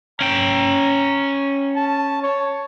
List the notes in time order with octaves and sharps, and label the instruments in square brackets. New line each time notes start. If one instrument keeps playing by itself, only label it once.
[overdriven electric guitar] C#4 G5 [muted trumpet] A#5
[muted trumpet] A5
C#5